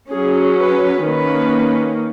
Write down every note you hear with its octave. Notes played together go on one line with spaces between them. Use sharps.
F#3 C#4 G#4
B4
D#3 A#3 C#4 B4